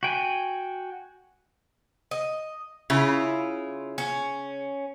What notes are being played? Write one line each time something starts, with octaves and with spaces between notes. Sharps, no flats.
F#4 G5 G#5
D#5
C#3 E4 F4
C#4